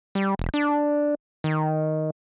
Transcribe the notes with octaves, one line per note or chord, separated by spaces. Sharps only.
G3
E1
D4
D#3